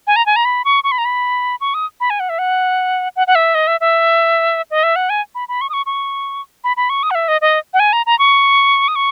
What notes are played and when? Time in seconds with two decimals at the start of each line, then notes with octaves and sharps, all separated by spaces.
0.07 G#5
0.16 A#5
0.26 G#5
0.36 A#5
0.45 B5
0.65 C#6
0.84 C#6
0.92 B5
0.98 A#5
1.05 B5
1.61 C#6
1.74 D#6
2.00 B5
2.10 G#5
2.20 F#5
2.29 E5
2.39 F#5
3.16 F#5
3.27 F#5
3.35 E5
3.55 D#5
3.67 E5
3.81 E5
4.71 D#5
4.83 E5
4.96 F#5
5.10 G#5
5.35 B5
5.49 B5
5.61 C#6
5.70 D#6
5.73 C#6
5.86 C#6
6.64 B5
6.77 B5
6.90 C#6
7.03 D#6
7.11 F#5
7.15 E5
7.28 D#5
7.41 D#5
7.74 F#5
7.80 G#5
7.93 A#5
8.06 A#5
8.19 C#6
8.88 D#6
8.96 C#6